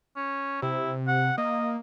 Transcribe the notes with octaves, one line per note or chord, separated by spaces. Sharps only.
C#4
C3 E4
F#5
A#3 D#5